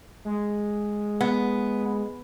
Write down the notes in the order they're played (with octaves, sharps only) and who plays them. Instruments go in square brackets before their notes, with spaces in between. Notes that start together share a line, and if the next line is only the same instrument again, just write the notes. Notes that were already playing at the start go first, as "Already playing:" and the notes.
[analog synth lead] G#3
[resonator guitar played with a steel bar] B3